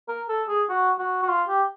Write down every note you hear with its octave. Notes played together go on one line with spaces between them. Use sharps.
A#4
A4
G#4
F#4
F#4
F#4
F4
G4